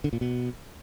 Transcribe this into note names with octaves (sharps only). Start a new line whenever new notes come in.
D3
A#2
B2